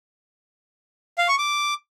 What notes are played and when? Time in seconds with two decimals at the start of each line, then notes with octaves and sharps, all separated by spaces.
1.18 F5
1.28 C#6
1.38 D6